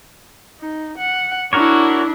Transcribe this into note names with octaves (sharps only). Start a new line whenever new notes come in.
D#4
F#5
D4 E4 F#4 A#4 C#5